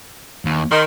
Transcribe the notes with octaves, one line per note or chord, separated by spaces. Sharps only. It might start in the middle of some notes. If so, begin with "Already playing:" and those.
D#2
D#3 C6